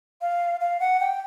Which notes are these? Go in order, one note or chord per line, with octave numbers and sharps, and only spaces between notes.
F5
F5
F#5
G5